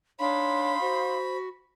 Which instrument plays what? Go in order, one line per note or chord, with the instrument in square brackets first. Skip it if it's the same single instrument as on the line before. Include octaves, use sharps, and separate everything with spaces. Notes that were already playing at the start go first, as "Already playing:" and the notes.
[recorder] D4 [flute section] D#4 F5 C6 [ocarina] C#5 [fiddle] B5
[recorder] F#4 [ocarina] C5